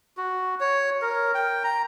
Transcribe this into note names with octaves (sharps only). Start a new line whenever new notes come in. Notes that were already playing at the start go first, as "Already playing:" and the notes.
F#4
C#5
A#4
G5
A#5